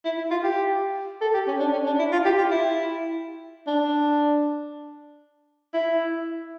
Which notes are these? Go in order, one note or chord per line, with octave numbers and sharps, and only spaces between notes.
E4
E4
F4
G4
A4
G4
C#4
D4
C#4
D4
E4
F4
G4
F4
E4
D4
E4